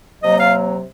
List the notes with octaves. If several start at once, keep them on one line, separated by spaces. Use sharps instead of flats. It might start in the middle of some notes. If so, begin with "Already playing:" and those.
C3 F#3 A#3 D#5
F5